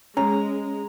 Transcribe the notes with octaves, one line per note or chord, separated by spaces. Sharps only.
G#3 C#4 A#5